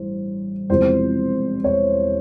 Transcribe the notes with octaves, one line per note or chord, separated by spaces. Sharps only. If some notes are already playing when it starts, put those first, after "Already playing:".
Already playing: A1 G2 C5
E1 E2 C3 F3 C5
C#5